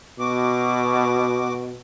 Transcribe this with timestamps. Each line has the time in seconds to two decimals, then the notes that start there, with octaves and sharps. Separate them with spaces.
0.19 B2 F#4 D6